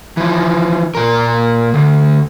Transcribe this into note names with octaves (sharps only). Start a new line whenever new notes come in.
E3 F3
A#2 A#4
D2